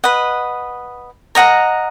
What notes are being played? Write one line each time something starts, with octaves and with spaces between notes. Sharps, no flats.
B4 D#5 F#5
A#4 D#5 F#5 A#5